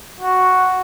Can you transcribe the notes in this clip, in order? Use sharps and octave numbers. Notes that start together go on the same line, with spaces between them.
F#4